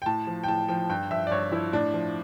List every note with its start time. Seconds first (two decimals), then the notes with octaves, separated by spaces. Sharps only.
0.02 G5
0.06 A2 A5
0.27 F3
0.43 G5
0.48 A2 A5
0.68 F3 G5
0.89 G2 G5
1.11 F3 E5
1.27 D5
1.31 G2 C#5
1.52 F3 E4
1.73 A2 D4
1.94 F3